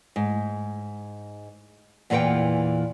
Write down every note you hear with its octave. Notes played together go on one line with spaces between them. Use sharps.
G#2
E2 A#2 E3 D#5 F#5 G5